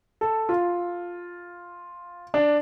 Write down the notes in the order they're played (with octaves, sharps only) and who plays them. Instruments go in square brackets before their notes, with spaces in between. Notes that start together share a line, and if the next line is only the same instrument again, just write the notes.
[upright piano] A4
F4
D4